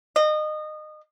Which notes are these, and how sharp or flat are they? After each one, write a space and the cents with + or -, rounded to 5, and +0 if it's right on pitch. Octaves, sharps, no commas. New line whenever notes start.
D#5 -25